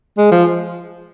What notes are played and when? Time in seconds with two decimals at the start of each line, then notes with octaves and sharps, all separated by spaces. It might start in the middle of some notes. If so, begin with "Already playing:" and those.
0.18 G#3
0.32 F3